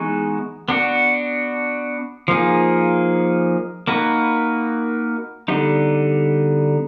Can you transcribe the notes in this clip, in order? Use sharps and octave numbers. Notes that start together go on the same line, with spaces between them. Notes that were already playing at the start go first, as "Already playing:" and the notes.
Already playing: E3 G#3 B3 D#4 F#4
B3 D4 F#4
F3 A#3 D#4 G#4
A#3 D#4 F#4 B4
D3 G3 B3 D#4